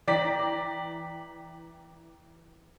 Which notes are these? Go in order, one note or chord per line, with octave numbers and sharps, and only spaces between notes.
E3 D5 G5 A#5 A#6 B6